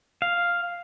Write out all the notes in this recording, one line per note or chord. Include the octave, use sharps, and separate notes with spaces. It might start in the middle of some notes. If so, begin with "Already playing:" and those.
F5